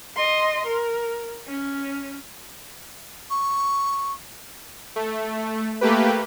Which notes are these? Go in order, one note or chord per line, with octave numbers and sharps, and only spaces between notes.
D#5 C6
A#4
C#4
C#6
A3
A3 A#3 G4 B4